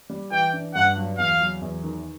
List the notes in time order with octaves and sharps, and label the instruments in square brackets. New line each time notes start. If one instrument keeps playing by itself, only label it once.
[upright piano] G3
[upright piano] E3 [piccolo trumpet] G5
[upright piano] D4
[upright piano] G2 [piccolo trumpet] F#5
[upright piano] F#3
[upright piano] E2 [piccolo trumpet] F5
[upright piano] F#3
E2
D#3